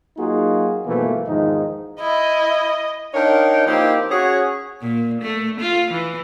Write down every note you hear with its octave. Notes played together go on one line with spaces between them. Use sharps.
F#3 A#3 D#4 F4 F#4 G#4
G2 B2 E3 F3 A3 A#3
E2 G#2 D#3 F3 D#4
E4 D#5
D4 D#4 A#4 C#5 F5 G5
F3 A#3 C4 D#4 E4 G4
C#4 F#4 G#4 C#5
A#2
A3
F4
E3